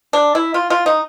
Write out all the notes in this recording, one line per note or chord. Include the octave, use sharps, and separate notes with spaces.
D4
E4
F4
F4
D#4